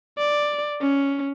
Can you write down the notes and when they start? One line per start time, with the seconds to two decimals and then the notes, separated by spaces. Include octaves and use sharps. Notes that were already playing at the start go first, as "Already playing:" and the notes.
0.18 D5
0.82 C#4